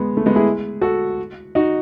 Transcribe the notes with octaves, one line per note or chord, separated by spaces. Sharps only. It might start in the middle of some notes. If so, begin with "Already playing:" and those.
Already playing: G#3 B3
A3
G#3 B3
E4 G#4
F#4 A4
D#4 F#4